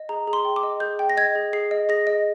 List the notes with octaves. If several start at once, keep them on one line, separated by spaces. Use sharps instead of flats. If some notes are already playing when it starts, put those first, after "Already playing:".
Already playing: D#5
G#4 A#5
G#4
C6
G5
D6
D#5
G#4 G6
G5
A#6
D#5 G#6
G#4
G#4 C7
D#5
G#4 A#6
D#5